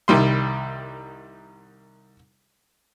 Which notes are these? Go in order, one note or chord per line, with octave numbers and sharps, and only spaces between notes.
C2 D#3 G3 C6